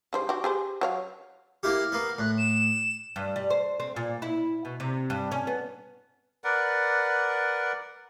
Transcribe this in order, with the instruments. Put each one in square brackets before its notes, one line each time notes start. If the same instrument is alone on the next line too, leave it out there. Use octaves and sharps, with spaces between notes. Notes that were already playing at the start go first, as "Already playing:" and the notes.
[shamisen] C#3 G3 C5
F#4 G4
G4 G#4 C5
F#3 C#5 F5
[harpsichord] A#3 E4 G4 [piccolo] F6
[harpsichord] A#3 B3
[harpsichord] A2 [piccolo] F#6
[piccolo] E7
[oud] G2
G3
C5
C4
A#2
E4
B2
C3
G2
C#4
B3
[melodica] A#4 B4 D5 F#5